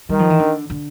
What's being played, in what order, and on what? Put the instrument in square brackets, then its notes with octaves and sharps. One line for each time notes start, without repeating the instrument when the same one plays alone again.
[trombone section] D#3 [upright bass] G3
[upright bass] F3
E3
D3
D3